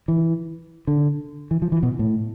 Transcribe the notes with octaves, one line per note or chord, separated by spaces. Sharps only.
E3
D3
E3
F3
E3
B2
A2